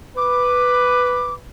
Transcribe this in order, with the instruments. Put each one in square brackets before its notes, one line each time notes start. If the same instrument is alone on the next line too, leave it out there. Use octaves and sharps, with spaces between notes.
[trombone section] B4 [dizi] D6